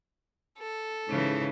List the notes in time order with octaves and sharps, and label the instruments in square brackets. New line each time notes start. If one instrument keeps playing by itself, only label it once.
[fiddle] A4
[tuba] G#2 [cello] C#3 E3